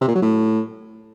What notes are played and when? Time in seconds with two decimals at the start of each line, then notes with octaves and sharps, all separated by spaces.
0.01 C3
0.08 A#2
0.15 F#3
0.22 A2